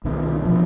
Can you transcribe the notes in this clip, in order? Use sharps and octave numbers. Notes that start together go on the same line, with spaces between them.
C2 B2 D#3
B2 F3